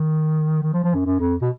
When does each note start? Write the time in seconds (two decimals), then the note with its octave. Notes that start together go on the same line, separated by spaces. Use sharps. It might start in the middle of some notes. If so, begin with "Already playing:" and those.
Already playing: D#3
0.62 D#3
0.73 F3
0.84 F3
0.94 F#2
1.06 F#2
1.20 F2
1.42 B2